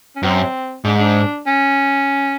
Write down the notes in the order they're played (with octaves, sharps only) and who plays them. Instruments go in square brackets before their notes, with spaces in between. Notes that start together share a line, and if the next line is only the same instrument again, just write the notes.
[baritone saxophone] C#4
[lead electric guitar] F#2 [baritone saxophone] C4
[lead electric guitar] G#2 [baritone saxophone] D4
[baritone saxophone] D4
C#4